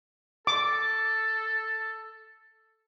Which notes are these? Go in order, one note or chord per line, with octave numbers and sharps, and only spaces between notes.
A4 D6